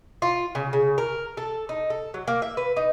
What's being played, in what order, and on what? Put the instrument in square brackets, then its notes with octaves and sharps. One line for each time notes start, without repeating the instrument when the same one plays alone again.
[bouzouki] F4
C#3
C#3
A#4
A4
D#4
A4
F#3
A#3
E5
B4
D#4